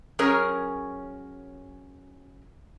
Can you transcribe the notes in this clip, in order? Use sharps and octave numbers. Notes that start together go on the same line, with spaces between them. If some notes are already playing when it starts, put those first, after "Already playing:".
F#3 C#4 G#4 A#4 C#5